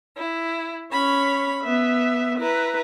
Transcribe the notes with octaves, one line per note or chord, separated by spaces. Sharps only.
E4
C#4 C#5 B5
B3 E5
E4 B4 A#5